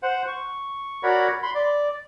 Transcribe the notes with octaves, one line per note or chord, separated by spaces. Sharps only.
C5 F#5
C#6
F#4 A#4 C#5 D5 F#5 B5
B5 C6
D5